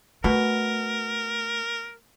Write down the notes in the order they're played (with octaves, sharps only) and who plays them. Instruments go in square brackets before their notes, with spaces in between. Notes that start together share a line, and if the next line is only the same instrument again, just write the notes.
[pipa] B2 [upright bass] A3 [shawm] A#4